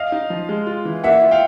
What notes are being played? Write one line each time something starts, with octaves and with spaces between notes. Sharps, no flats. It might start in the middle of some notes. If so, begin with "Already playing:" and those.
Already playing: D#5 F5
D#4
F3
G#3
F4
E3
A#3 E5 F#5
F4
F5 G5